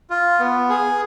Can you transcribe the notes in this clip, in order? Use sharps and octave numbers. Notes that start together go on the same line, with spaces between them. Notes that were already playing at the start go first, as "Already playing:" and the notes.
F4
B3
G#4